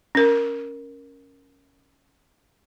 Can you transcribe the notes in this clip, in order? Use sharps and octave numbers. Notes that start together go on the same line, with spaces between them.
C#4 A#4